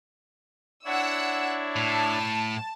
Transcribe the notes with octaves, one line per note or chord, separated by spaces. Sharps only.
D4 E4 C#5 F#5 E6
A2 A5